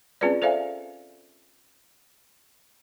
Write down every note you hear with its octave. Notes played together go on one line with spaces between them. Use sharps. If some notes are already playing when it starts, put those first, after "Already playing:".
C4 C#4 F4 G#4 B4 D5
A4 C5 D5 E5 F5 G#5